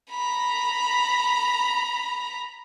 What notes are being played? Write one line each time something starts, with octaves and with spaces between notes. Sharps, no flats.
A#5 B5